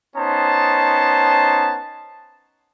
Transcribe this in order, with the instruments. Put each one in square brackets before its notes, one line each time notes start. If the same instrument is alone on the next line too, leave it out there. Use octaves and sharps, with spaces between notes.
[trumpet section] B3 C#4 D#4 C5 A5